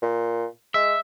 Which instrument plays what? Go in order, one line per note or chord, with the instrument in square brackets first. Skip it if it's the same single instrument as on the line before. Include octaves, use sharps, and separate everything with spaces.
[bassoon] A#2
[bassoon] G#3 [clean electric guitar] E5